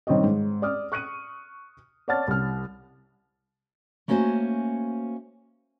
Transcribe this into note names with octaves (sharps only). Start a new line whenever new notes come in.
G2 D#3 C4 C#5 D#5
G#2
D5 D#6 F6
C#6 F#6 C#7 D#7
C#5 D5 F#5 A5 F6 A6
C2 F6
A3 A#3 C#4 F#4 C5 G#5